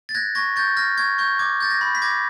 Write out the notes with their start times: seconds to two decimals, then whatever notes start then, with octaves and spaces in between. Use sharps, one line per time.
0.09 A6
0.15 F#6 G#6 A#6
0.35 C#6 G#6 A#6
0.56 C#6 G6 A6
0.77 F6 G#6 A#6
0.97 C#6 G#6
1.18 C#6 G6
1.39 D6 G#6
1.60 G6 A6
1.70 G#6 A#6
1.81 B5
1.95 B6
2.02 D6 G#6 A#6